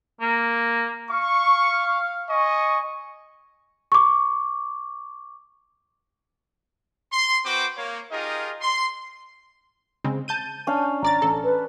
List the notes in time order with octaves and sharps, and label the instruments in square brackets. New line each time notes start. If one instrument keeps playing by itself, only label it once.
[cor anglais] A#3
[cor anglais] F5 [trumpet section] C#6
[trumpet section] D#5 G#5 C#6
[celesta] C#6 D6
[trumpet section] C6
C4 F#4 B4 C5 G5 D6
A#3 C#5
D#4 F4 G4 G#4 A#4 D#5
C6
[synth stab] C#3 G#3 C4
A5 G6 D#7
[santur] C#4 D4 F5
[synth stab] G#1 D5 A6 [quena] A#5
[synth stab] A1 A4
[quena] B4